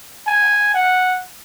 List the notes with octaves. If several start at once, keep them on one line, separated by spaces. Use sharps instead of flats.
G#5
F#5